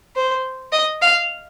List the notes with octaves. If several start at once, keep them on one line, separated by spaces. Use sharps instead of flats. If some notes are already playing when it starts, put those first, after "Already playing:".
C5
D#5
F5